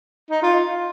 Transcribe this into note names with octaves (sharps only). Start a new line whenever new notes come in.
D#4
F4